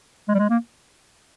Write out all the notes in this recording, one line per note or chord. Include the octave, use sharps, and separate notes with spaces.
G#3
G3
G#3
A#3